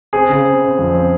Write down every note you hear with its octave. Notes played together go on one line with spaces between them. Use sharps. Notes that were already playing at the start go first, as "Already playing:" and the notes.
C4 G#4
C#3
C4
C4
F2
C4